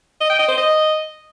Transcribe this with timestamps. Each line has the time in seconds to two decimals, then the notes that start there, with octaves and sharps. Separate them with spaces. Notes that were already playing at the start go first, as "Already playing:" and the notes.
0.21 D#5
0.30 G5
0.39 D#5
0.48 C5
0.57 D#5